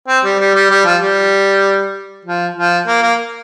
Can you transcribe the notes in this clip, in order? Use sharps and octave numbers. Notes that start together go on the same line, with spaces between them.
C4
G3
G3
G3
G3
F3
G3
F3
F3
A#3
A#3